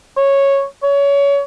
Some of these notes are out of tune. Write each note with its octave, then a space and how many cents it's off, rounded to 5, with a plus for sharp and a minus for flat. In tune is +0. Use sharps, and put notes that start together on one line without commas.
C#5 -5
C#5 +25